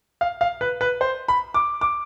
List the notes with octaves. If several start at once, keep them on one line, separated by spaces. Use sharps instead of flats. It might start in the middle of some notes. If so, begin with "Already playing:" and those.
F5
F5
B4
B4
C5
B5
D6
D6